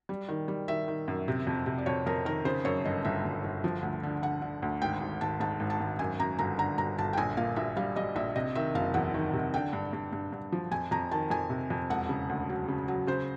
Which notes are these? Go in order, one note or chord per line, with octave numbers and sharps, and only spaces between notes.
G3
D#3
G3
D#3 E5
D#3
F#2
C3
F2
C3
D5
F2 C#5
F2 A#4
D#3 A#4
C#3 C5
F#2 C#5
G1 D#5
G1 E5
G1
G1
F3
D2
D3
D3 F#5
D3
D2
G#1 G5
G#1
G#1 A5
G#2 A5
G#1
A5
G#1
F#2 G#5
F#2 A#5
G1 A#5
D3 A#5
G1 A#5
G1 A5
G5
A#1 G#5
A#2 F5
A#1 E5
G3 F5
G3 D#5
A#1 E5
C3 D#5
D#3 E5
F#1 F5
E2 F#5
D#3
C3
D3 G5
G2
G2
G2
G2
F3
F2 G#5
F2 A#5
D#3 A5
F2 G#5
C3
F2
E1 F#5
C#3
D2
F#3
C#3
F#3
C#3 C5